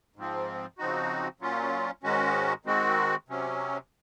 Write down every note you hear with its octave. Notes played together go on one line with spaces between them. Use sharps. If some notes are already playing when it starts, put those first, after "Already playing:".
G#2 F3 C4
C#3 F3 C4 D#4 F#4
A#2 F#3 C#4 F4
G#2 D#3 G#3 C#4 F#4
D#3 G#3 C4 F#4
C3 F#3 C#4